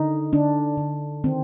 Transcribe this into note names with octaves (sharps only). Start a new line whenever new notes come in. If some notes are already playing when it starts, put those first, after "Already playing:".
Already playing: D3 D#4
D3 D4
D3
D#3 C4